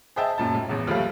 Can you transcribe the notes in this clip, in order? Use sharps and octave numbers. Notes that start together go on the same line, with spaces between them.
G#4 C5 D#5 E5 G5 A5
F#2 A#2 A5
A2
A1 E2
D#2 F3 G3 A3 F5